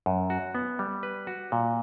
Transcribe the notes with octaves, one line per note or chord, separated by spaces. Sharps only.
F#2
F#4
B3
G3
B4
F#4
A#2